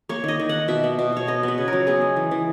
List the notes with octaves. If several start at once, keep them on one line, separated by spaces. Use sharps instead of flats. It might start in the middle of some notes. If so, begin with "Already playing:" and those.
A#3 C#5
D#3 D#5
D#3
A#3 F#5
B2 E5
B3
B2
B2 C#5
B3 D#5
B3 B4
C#3
F#3 A#4
B3 G#4
G#3
E3
E3